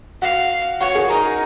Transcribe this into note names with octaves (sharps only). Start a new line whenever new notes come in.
F#4 F5
F#4 C#5
G#4
D#4 A#4